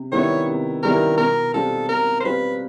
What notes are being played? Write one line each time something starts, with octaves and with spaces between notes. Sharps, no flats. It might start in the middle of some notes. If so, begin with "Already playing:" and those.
Already playing: C3
D#3 G3 B3 E4 C#5
C3
D#3 G3 B3 E4 A#4
B2 A#4
G3 C4 F4 A4
B2 A#4
C5
G3 C4 F4 B4